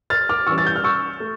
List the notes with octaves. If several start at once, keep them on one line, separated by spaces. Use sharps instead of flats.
F6 A6
D6 F6
E3 G3 C#4 C#6 E6
A6
G6
F6
C#6 E6
A3